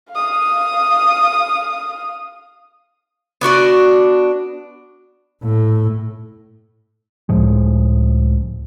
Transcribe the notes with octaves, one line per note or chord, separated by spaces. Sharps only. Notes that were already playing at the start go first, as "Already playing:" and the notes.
F5 D#6
B3 D4 F#4 D5
A2
C#2 A2 F3 G#3